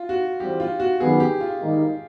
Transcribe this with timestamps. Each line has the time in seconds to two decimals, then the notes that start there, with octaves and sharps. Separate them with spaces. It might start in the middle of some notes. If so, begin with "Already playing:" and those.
Already playing: F4
0.09 F#4
0.40 E3 G3 C4 G4
0.60 F4
0.80 F#4
1.00 F#2 D#3 G3 B3 G#4
1.20 G4
1.41 F4
1.61 G#2 D#3 G3 A#3 D#4